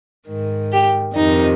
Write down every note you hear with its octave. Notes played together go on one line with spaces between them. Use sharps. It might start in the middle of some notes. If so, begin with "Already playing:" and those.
G#2 D#3
G4
F2 C3 D#3 D#4